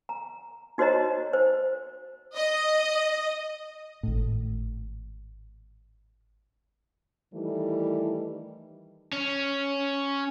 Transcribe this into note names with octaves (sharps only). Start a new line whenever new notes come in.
A#5
D#4 F#4 C5 C#5 D#5 A#5
C5
D#5
G#1 A2
D#3 E3 G3 A3 D#4 E4
C#4